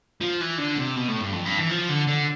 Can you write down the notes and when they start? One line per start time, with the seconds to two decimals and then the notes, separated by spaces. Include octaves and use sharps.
0.21 F3
0.41 E3
0.58 D3
0.78 C3
0.96 B2
1.09 A2
1.21 G2
1.33 F2
1.46 G2
1.59 E3
1.70 F3
1.90 D3
2.07 D3